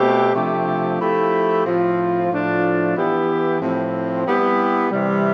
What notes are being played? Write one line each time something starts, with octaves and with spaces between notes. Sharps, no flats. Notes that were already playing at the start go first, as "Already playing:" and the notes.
Already playing: B2 A3 C4 G4
C3 F3 A3 D4 G4
F3 A3 E4 G4
A2 F3 C4 F4
A2 F3 A3 D4 F4
E3 B3 E4 G4
A2 F3 C4
G3 B3 E4 G4
C3 E3 G3